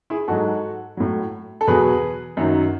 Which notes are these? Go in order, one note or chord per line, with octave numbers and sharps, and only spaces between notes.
E4 G#4
G#2 F#3 F#4 A4
A2 F#3
A4
E2 B2 F#3 G#4 B4
F#2 D#3 F#3